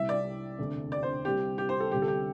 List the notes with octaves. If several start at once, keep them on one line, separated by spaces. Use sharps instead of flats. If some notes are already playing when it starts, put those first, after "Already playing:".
Already playing: C2 C3 G3 E4 E5
D5
E1 D2 C3 A3 D4
D5
C5
C2 C3 G3 C4 G4
G4
C5
A4
D2 C3 G3 G4
A4
G4